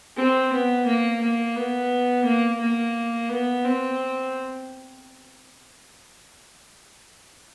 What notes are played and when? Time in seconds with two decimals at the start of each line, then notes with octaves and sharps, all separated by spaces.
0.17 C4
0.53 B3
0.86 A#3
1.21 A#3
1.56 B3
2.25 A#3
2.61 A#3
3.29 B3
3.64 C4